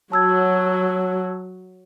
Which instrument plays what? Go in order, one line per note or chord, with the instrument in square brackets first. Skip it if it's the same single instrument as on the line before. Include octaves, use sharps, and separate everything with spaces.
[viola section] F#3 [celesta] A5 E6 G#6